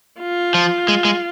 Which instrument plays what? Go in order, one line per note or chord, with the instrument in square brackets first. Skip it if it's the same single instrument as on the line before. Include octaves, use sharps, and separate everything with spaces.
[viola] F4
[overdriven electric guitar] F3
G#3
G#3